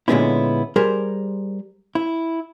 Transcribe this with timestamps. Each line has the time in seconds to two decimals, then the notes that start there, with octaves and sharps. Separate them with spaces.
0.08 A#2 D3 G#3 B3 C#4 E4
0.76 G3 G#4 A#4 C5
1.95 E4